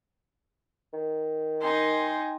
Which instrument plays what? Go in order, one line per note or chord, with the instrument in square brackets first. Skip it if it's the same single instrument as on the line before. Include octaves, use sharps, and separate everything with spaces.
[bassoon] D#3
[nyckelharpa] D#4 [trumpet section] G5 G#5 [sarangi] C6